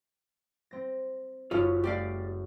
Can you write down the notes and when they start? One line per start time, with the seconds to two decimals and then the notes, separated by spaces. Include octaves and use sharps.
0.71 C4 A#6
1.51 F#1 F#2 F4 C#5
1.84 A3 G4 D5 F5